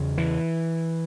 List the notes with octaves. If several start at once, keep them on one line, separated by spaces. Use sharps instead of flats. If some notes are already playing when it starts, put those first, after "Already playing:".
Already playing: E2 C#3
E3